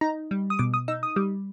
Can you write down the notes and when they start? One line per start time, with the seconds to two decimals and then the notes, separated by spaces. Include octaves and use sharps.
0.01 D#4 A#5
0.31 G3
0.50 D#6
0.59 B2 D6
0.74 D#6
0.88 D#4 E6
1.03 D#6
1.16 G3